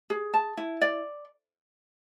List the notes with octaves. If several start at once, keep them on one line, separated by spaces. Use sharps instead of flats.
G#4
A5
E4
D5